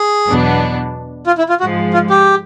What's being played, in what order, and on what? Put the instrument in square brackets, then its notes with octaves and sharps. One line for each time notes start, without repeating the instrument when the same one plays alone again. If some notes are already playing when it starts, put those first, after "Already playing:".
Already playing: [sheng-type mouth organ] G#4
[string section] E2 B2 F#3 B3 D4
[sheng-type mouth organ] F4
E4
F4
[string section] G#2 F3 G#3 [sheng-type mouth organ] F#4
[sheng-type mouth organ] F4
G4